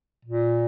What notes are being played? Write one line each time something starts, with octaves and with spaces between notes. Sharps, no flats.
A#2